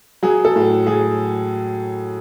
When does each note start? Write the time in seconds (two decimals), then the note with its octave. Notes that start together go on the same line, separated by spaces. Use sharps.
0.23 F#3 G#4
0.45 A4
0.56 A2
0.87 F#3 G#4